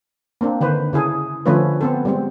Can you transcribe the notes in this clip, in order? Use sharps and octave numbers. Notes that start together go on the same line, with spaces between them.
A#3 C4 D4
D3 D#3 B4 C5
C#3 E4 G#4 A4
D3 F3 A3 C#4 F4 B4
B3 C4 A4
G3 G#3 C4